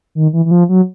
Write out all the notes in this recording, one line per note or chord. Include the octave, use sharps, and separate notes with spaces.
D#3
E3
E3
F3
F#3